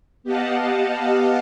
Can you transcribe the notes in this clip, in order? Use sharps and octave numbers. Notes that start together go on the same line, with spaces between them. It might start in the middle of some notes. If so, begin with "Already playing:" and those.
B3 G4 D#5 F5 F#5 A5